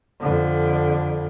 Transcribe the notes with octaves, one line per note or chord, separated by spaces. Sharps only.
F2 D3